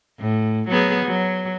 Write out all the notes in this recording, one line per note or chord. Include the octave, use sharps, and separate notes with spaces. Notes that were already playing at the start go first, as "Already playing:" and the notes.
A2
F#3 B3 G#4
F#3